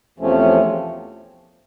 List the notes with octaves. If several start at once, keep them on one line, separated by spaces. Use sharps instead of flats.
E2 C3 F3 A3 C#4